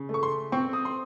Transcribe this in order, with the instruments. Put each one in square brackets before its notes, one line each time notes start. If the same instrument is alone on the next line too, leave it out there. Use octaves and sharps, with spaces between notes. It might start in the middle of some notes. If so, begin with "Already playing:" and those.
Already playing: [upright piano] C#3
A3
C#6
C6
C4 C#6
D#6
C6